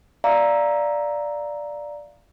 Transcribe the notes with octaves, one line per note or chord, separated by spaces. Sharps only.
D5 E5 F5 A#5